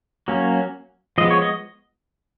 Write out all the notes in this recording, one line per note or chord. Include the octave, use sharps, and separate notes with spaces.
F#3 A#3 C#4
F3 G#3 B3 D#5
C#5
D#5